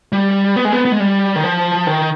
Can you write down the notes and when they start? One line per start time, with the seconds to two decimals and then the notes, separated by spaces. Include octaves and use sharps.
0.13 G3
0.56 B3
0.65 G#3
0.72 B3
0.85 B3
0.92 G#3
1.00 G3
1.36 D#3
1.44 F3
1.87 D#3